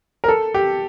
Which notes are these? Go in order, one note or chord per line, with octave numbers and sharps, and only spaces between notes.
A#4
A4
G4